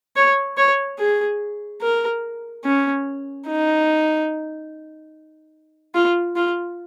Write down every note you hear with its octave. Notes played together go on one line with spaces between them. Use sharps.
C#5
C#5
G#4
A#4
C#4
D#4
F4
F4